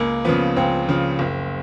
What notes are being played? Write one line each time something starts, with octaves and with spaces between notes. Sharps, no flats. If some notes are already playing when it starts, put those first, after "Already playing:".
Already playing: C#2 A#3
C#3 F3 B3
C#2 C4
C#3 F3
F#1